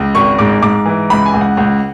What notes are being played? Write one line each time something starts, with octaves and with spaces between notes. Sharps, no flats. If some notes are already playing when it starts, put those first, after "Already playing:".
Already playing: C#2
G#1 C#6
G#2 D6
G#2 D6
E3
C#2 B5
G#5
C#2
F#5
C#2